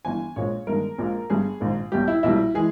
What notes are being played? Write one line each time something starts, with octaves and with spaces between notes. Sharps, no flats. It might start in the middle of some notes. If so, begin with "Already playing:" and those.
G1 G2 E3 G#5
A#1 A#2 G#3 C#5
G1 G2 D#3 G#3 A#4
A#1 A#2 G#3
G1 G2 G3 G#4
A#1 G#2 D#3 G#3
B1 B2 G3 G4
E4
B1 A#2 G3 E4
E3 G#3 G#4